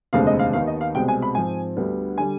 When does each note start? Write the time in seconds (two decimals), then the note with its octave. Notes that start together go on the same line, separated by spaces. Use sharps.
0.13 F1 D#2 D3 G#3 C4 F5
0.27 D#5
0.39 F5
0.53 D#2 D#3 B3 D#4 F5
0.67 D#5
0.81 F5
0.95 C2 B2 G#3 C4 G5
1.08 G#5
1.22 B5
1.35 G#2 F3 C4 G#5
1.77 D2 D3 G3 B3
2.18 D3 G3 G#5